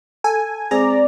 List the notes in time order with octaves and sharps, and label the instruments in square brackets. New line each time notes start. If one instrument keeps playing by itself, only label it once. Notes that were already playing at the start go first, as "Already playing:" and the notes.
[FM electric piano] A4 [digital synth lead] G#5
[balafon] G#3 C4 C5 [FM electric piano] G#4 [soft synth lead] D5 [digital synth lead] A#5